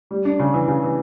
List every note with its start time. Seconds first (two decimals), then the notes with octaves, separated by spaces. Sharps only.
0.11 G3
0.25 D4
0.39 C#3
0.54 E3
0.68 C#3
0.82 E3